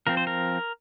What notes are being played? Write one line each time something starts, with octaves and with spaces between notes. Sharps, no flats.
F3 C4 A#4
C5
A#4